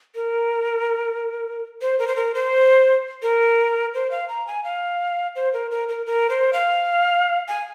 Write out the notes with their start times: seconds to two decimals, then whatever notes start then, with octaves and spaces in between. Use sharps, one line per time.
0.15 A#4
1.82 C5
1.99 A#4
2.07 C5
2.16 A#4
2.35 C5
3.22 A#4
3.94 C5
4.11 F5
4.29 A#5
4.47 G#5
4.64 F5
5.36 C5
5.53 A#4
5.71 A#4
5.88 A#4
6.06 A#4
6.30 C5
6.53 F5
7.48 G#5